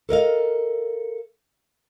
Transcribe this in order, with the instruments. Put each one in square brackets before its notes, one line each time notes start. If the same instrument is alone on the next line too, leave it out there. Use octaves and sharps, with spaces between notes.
[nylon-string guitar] A4 A#4 D#5 F5